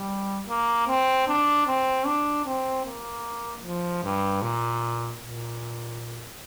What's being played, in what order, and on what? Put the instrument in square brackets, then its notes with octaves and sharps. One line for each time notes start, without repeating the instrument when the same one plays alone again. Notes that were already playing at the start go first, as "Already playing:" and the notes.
Already playing: [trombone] G3
A#3
C4
D4
C4
D4
C4
A#3
F3
G2
A#2
A#2